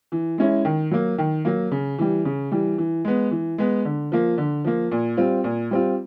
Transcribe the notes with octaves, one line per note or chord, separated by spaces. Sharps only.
E3
G#3 C#4 E4
D#3
F#3 A#3
D#3
F#3 A#3
C#3
E3 G3
C#3
E3 G3
E3
G#3 B3
E3
G#3 B3
D3
F3 A#3
D3
F3 A#3
A#2
G3 C4 F4
A#2
G3 C4 F4